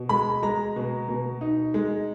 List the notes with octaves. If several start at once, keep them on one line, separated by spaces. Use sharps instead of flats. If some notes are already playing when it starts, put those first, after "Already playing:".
Already playing: B2
G#3 B5
G#3 A#5
B2
B2
D#4
G#3